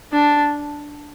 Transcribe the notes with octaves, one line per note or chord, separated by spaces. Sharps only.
D4